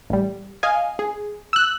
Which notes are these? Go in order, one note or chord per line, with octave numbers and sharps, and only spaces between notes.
A1 G3
D#5 F5 G#5
G#4
E6 F#6